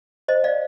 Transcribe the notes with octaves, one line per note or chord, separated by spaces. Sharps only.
C5 D#5
D5 F5